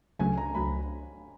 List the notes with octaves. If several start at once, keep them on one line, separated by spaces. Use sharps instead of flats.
C#2 C#3 F#3 A3 G#5
A#5
C#2 C#3 F#3 A3 B5